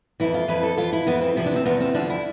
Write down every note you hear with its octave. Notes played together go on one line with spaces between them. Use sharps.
F2 E3 E4
F4
F2 E3 B4
A4
F2 E3 F4
E4
F2 E3 B3
C4
E2 C3 F3 E4
D4
C4
E2 C3 F3 B3
C4
F2 D3 F3 D4
E4